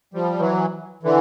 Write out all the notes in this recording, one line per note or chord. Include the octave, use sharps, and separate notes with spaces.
F3 G3
E3 F#3
D3 E3